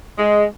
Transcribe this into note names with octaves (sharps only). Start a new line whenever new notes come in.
G#3